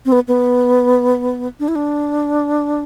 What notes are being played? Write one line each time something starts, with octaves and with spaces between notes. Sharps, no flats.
C4
B3
B3
D4
E4
D4